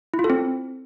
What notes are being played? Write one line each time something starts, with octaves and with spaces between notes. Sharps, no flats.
E4
F4
A4
C4